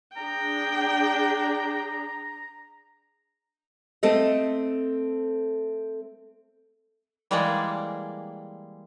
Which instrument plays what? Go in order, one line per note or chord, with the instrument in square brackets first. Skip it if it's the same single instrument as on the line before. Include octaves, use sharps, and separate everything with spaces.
[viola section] D4 G#4 [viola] G5 [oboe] A#5
[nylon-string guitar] A3 C4 A4 C5 D#5
[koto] E3 G3 G#3 A#3 G#4 D5